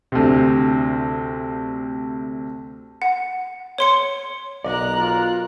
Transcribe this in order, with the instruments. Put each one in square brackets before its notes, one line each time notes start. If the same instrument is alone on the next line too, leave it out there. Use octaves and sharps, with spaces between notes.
[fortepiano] D2 C3
[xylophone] F#5
C#5 C6 C#7
[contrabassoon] B1 [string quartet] A#4 F#6 [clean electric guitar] D5 D#5
[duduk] F4 [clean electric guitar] A#5